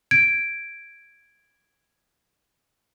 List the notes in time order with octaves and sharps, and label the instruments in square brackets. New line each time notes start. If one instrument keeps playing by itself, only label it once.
[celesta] G#6 D7